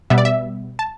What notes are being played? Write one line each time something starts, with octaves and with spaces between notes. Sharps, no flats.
B2 G3 B3 E5
D5
E5
A5